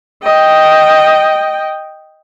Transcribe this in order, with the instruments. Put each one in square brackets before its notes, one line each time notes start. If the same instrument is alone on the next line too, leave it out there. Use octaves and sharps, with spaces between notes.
[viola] D#5 G5